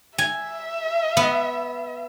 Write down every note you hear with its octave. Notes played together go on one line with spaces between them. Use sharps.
E5 G#5
B3